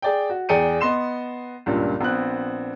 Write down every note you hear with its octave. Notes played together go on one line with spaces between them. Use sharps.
G#4 D5 G5
F#4
E2 G#4 D5 G5 C#7 D#7
B3 D#5 C6 E7
C#2 G2 A#2
A#1 B3 C4 F#6